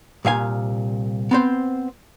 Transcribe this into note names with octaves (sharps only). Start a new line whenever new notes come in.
C2 A#2 F5 G#5
B3 C4 C5